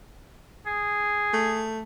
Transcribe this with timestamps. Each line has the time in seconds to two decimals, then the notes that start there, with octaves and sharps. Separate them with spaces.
0.66 G#4
1.34 A3